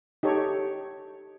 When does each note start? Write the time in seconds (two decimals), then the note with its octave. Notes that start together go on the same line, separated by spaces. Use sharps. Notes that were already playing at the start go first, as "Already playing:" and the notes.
0.23 D#4 G4 A4 C#5